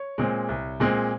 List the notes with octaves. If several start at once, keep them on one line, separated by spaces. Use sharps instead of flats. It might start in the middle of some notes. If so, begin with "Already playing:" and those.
Already playing: C#5
A#2 G#3 C4
C2
A#2 G#3 C4